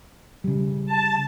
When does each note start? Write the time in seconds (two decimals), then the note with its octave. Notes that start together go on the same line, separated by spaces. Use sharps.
0.44 C#3 G3
0.86 A5